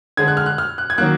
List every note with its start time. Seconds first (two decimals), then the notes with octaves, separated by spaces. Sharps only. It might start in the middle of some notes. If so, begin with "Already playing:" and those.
0.17 D3 G#3 G#6
0.28 F#6
0.37 F6
0.46 F#6
0.58 F6
0.78 F#6
0.90 G#6
0.98 D#3 F#3 A#3 F#6